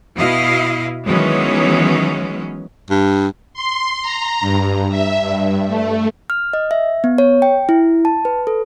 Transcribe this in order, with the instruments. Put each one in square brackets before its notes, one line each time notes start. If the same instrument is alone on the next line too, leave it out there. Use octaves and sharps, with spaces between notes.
[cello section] B2 E4 D#5 F5
D#3 E3 F#3 G#3 B3 C#4
[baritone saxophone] G2
[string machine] C6
A#5
G2
E5
G2
A3
[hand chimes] F6
D#5
E5
B3
C#5
G5
E4
A5
B4
A4